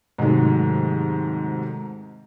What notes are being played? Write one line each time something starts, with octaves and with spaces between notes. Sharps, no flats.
G#2 C3 D#3 F#3 G#3 A3